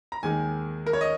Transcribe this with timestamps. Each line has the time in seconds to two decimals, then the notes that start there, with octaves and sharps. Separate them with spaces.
0.12 A#5
0.23 D#2 D#3 G#3 G#5
0.86 A#4
0.93 C#5
1.01 D#5